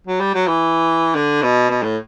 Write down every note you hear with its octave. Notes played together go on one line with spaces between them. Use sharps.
F#3
G3
F#3
E3
D3
B2
B2
A2